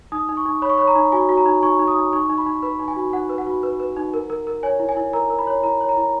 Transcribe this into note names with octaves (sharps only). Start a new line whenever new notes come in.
D#4 D#6
D#4
C#6
D#4
C#5 B5
C#6
C#5 B5
A#5
D#4
F#4 G#5
F#4
A#5
D#4
D#4 C#6
D#4
D#6
D#4
D#4 C#6
D#4
B5
D#4
B4 B5
D#4
G#5
F#4
D#4 F#5
B4
F#5
F#4
B4
B4
D#4
A#4
A#4
A#4
C#5 G#5
E4
G#5
E4
A#4 A#5
A#4
B5
C#5
E4 A#5
C#5
A#5
E4